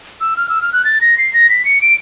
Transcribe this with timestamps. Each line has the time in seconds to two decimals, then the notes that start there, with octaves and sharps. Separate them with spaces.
0.21 E6
0.37 F6
0.49 E6
0.62 F6
0.73 F#6
0.85 A6
1.01 A#6
1.18 C7
1.33 A#6
1.50 B6
1.65 C#7
1.81 D7